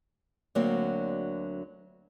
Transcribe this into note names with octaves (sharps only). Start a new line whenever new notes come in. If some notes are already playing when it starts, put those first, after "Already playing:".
D2 D3 F#3 A#3 C4